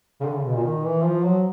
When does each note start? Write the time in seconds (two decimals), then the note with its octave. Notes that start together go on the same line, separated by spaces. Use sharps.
0.21 C#3
0.25 D3
0.35 C#3
0.45 B2
0.55 A#2
0.64 D#3
0.84 E3
1.04 F3
1.23 F#3